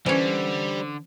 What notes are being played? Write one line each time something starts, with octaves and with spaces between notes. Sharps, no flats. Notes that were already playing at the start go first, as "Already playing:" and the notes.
D3 E3 G3 C#4 C5